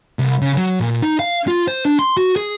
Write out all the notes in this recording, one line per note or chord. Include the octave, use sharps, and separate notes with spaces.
C2
C#3
F#3
A#2
D#4
F5
F4
C5
D4
C6
F#4
G#4